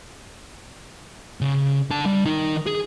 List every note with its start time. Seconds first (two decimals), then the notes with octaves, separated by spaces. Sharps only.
1.41 C#3
1.91 D3 A5
2.06 G3
2.25 D#3 D#4
2.66 G#4